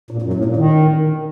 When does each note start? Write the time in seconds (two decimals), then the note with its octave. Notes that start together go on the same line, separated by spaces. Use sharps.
0.11 A#2
0.22 F#2
0.33 A2
0.45 A#2
0.56 D#3